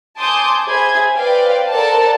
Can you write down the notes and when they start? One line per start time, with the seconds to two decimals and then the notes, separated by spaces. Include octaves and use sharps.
0.18 G#5 A5 C6 D6 D#6 G6
0.68 G#4 C5 E5 B5 G#6
1.15 B4 C5 D5 F5 G5
1.71 A4 A#4 C5 D5 F#5 A5